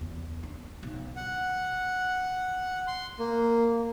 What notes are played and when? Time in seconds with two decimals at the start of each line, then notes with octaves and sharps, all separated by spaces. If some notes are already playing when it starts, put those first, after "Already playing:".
0.01 E2
0.43 D4
0.83 B1
1.16 F#5
2.87 C6
3.19 A#3